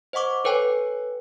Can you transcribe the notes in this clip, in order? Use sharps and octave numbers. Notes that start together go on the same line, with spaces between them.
C5 D#5 F#5 C#6 D6
A4 B4 C#5 G5 G#5